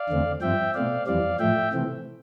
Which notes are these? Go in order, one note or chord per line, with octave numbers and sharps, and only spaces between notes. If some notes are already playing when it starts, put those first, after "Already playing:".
Already playing: D5 F5
E2 D3 A3 C4
G2 F3 C4 E5 G5
B2 A3 C4 D5 F5
F2 E3 G3 C4 D5 F5
A2 F3 A3 E5 G5
C3 E3 A3 C4